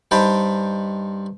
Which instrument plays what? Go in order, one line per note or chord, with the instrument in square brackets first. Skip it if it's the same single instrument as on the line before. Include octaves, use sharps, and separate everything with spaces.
[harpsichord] G2 D#4 C5 G5 A5 B5